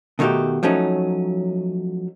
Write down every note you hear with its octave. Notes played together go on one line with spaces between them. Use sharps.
B2 D#3 A3 D#4 F#4 G4
F3 F#3 A3 C#4 D#4